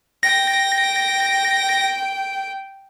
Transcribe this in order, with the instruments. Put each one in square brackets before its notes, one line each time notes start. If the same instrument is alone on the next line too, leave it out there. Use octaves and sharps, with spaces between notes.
[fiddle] G5 [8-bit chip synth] A#6